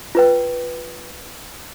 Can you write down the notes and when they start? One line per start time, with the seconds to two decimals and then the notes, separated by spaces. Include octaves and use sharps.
0.15 F4 B4 G5